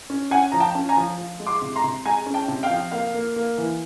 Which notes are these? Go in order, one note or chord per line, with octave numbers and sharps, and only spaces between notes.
C#4
C#4 F#5 G#5
F3 A#5
G5 A5
C#4
G#5 A#5
F3
F3
G#3
C6 D6
C3
A#5 C6
C3
G#3 G#5 A#5
C#4
G5 A5
C3
F5 G5
F3
A#3 F5
A#3
A#3
E3